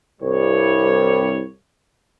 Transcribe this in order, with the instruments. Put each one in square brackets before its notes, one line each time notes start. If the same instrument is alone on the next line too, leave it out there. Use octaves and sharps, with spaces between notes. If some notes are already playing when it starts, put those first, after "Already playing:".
[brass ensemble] C2 G2 G3 C#5